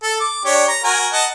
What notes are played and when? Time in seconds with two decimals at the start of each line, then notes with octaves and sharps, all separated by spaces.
0.03 A4
0.20 D6
0.45 D4 G4 C#5
0.68 A#5
0.84 F#4 A#4 G#5
1.12 D#5 F#5 A5